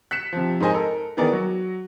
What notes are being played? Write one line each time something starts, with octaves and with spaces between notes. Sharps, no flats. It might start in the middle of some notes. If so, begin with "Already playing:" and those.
F#6 B6 C#7 E7
C3 F3
G#2 G#3 A#4 C5 D#5 G#5
A4 A#4
D#3 E3 B3 G#4 A#4 D5
F#3 F#4